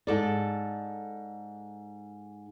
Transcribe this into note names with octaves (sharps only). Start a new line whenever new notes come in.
G#2 A4 D5